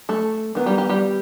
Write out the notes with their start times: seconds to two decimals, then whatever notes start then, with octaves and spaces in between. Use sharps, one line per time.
0.09 A3 A4
0.55 D#3 G#3 B3
0.66 G3 G4
0.78 G3 G4
0.89 G3 G4